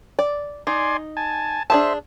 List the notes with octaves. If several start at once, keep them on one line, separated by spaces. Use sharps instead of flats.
D5
D#4 D5 G#5 C6
G#5 A5
D4 G#4 C5 E5 A5